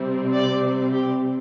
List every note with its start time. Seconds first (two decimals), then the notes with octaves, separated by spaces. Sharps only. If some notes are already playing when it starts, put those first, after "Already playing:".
Already playing: C3 G3 C4
0.34 D5
0.92 G4